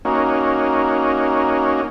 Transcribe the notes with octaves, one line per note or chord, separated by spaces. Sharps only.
A#3 C#4 D#4 F#4